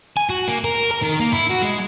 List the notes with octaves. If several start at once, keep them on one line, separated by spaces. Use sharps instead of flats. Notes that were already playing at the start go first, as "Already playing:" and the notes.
G#5
F#4
A#3
A#4
A#4
D#3
A#3
E4
F#4
G#3